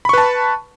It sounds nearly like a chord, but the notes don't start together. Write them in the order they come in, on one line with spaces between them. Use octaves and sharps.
B5 C#6 B4 A5